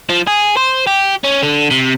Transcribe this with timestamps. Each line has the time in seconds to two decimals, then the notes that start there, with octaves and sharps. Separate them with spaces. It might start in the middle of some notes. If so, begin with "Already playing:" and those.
0.09 F3
0.27 G#4
0.57 C5
0.87 G4
1.24 C#4
1.43 D3
1.71 C3